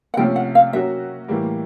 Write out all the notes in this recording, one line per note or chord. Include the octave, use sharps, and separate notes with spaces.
F#5
C3 F3 A3 C#4 G5
F#5
F5
F#3 A#3 C#4 F#4 E5
A2 E3 G3 A#3